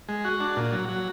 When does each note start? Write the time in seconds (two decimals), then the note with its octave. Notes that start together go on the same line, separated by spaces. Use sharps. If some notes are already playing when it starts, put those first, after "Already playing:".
0.08 G#3
0.25 F#4
0.40 D4
0.56 A#2
0.72 F#3
0.89 F#3